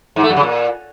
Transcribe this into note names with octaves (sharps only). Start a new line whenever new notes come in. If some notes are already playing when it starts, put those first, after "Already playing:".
G#2
A3
F#2
C#3
A#2